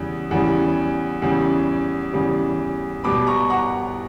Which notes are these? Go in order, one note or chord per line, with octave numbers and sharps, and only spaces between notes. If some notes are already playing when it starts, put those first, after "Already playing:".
Already playing: E2 C#3 G3
E2 C#3 G3
E2 C#3 G3
E2 C#3 G3
B2 G3 B5 D6
A#5 C#6
F#5 A#5